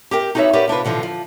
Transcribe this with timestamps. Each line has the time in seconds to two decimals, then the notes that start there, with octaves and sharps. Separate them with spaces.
0.11 G4 A#4 G5
0.35 D#4 F#4 G4 B4 C#5 E5
0.53 G4 A#4 B4 C#5 D5 F#5
0.68 C3 D4 F4 B4
0.85 B2 D3 E3 F3
1.03 F3